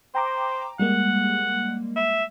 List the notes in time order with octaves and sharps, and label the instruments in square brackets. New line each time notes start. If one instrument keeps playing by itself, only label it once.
[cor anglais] C5 [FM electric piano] G5 A#5 D6
[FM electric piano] G3 G#3 A#3 [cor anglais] F#5
[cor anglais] E5